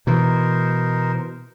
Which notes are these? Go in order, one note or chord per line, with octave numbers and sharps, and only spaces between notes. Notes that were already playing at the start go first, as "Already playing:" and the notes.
B2 E3 D#4 A#4 C5